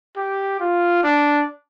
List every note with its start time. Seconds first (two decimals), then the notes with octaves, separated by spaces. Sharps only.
0.16 G4
0.60 F4
1.03 D4